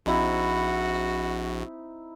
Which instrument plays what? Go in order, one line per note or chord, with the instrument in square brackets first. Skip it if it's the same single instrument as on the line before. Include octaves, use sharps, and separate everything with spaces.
[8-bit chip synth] A#1 [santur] C4 D#4 E4 [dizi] F#4